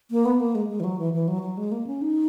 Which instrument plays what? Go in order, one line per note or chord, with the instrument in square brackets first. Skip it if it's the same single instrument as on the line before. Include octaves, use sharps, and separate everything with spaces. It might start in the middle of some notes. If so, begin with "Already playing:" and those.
[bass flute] A#3
B3
A#3
G#3
G#3
E3
F#3
E3
E3
F#3
F#3
G#3
A#3
C#4
D#4